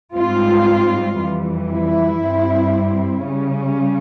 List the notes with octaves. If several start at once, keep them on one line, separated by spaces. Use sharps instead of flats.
G#2 G3 C4 F4
F2 E3 G3
E4
G2 G3 C4
C#3 G3 C#4